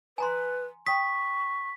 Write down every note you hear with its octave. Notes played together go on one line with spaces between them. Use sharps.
B4 G#5 A#5 C6
G5 C#6 D#6 B6